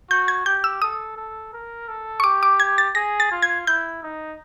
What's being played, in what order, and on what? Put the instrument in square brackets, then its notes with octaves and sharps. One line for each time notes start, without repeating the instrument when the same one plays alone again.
[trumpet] F#4 [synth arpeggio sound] G6
[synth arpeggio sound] G#6
[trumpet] G4 [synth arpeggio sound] G6
[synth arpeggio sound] E6
[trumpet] A4 [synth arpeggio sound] D#6
[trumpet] A4
A#4
A4
[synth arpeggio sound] C#6
[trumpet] G4 [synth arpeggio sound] D6
[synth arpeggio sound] D6
G#6
A6
[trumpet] G#4 [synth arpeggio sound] A#6
[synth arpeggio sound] A6
[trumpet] F4
[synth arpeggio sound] G#6
[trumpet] E4 [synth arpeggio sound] G6
[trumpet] D#4